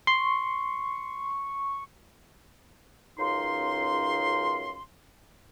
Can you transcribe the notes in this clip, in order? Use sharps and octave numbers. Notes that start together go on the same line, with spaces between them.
C6 C#6
C#2 F#2 D#4 F5 C6